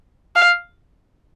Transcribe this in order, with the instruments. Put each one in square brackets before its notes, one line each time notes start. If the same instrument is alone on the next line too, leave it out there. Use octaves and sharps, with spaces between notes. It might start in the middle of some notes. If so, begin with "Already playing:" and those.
[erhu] F5